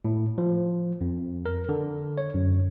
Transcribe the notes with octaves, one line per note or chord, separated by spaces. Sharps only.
A2
F3
F2
A#4
D3
C#5
F#2